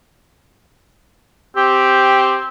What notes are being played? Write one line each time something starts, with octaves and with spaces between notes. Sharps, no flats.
C4 G4